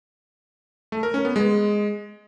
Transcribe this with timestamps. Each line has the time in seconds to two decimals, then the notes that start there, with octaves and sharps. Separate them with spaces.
0.92 A3
1.03 A#4
1.14 C#4
1.25 B3
1.36 G#3